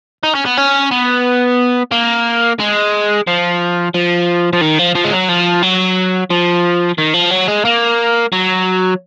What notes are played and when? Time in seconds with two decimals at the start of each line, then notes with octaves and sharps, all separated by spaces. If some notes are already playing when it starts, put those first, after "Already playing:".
0.23 D#4
0.35 C#4
0.45 B3
0.57 C#4
0.91 B3
1.92 A#3
2.60 G#3
3.27 F3
3.94 F3
4.53 F3
4.61 D#3
4.79 F3
4.95 F3
5.04 G#3
5.12 F#3
5.29 F3
5.63 F#3
6.30 F3
6.98 D#3
7.14 F3
7.31 F#3
7.48 G#3
7.65 A#3
8.33 F#3